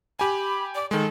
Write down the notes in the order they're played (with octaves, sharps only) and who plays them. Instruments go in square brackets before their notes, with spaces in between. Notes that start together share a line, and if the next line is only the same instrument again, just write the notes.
[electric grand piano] G4 G#5 [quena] B5
[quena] D5
[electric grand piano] D#3 G#3 [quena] A4